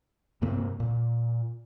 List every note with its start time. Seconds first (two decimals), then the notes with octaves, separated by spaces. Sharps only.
0.42 G2 C3 A#3 C4
0.80 A#2